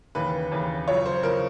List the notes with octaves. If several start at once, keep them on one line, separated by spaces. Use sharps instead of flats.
D#2 C#3 E3 B4
D#2 C#3 E3
F#2 C#3 F3 C#5
C5
C#3 F3 A#4